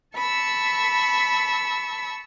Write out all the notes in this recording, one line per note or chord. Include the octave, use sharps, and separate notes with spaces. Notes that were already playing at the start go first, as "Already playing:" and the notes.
A5 B5 C#6 E6